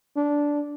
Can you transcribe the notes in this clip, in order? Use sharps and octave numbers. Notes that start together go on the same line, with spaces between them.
D4